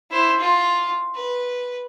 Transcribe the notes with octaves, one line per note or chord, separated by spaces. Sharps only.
E4 C5
F4
B4